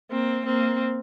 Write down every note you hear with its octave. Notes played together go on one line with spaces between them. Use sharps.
A#3 C4
A#3 C4